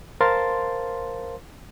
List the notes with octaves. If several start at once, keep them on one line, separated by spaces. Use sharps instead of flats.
A#4 C5 F5 A5 C6 A6